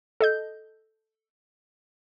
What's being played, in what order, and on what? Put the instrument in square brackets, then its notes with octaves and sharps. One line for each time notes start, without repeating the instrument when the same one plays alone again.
[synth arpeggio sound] A4 D#5 G6